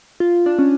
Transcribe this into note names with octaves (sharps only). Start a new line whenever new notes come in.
F4
D4
C#4